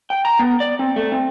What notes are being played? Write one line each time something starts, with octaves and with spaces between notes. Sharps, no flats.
G5
A#5
B3
D5
C4
A3
C4